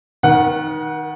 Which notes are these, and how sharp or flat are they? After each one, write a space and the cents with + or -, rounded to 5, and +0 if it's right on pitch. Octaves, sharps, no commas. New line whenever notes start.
D#3 +0 A#4 +45 F#5 +0